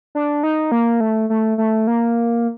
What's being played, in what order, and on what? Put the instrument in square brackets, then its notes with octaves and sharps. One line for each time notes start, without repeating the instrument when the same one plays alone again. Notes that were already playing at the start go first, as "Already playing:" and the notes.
[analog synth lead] D4
D#4
A#3
A3
A3
A3
A#3